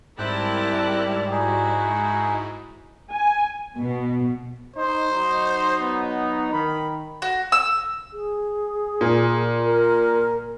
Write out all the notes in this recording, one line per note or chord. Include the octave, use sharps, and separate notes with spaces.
G#2 G3 C4 E4 A#4 G5 A5 F#6
D#4 E4 F#4 G#4
G#5
B2
D#4 C5
F#3 D#4
B3
D#3 B5
F#4
E6
G#4
A#2
A#4